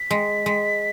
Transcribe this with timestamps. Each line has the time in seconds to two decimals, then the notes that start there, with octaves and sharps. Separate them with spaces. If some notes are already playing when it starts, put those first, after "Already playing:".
Already playing: B6
0.11 G#3
0.46 G#3